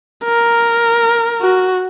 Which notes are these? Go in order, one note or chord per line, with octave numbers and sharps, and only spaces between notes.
A#4
F#4